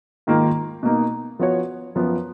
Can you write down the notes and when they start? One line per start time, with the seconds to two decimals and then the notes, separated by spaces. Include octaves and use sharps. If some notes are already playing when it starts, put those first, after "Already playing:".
0.27 G#2 D#3 A#3 F4 A#4
0.83 B2 A#3 D#4
1.39 F3 B3 F#4 C#5
1.95 F#2 F3 B3